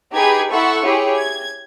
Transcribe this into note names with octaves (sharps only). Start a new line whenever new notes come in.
D#4 G4 G#4 B4 B5 G#6
E4 A4 E5 F#5 C6 C#6
E4 G4 G#4 C#5
G#6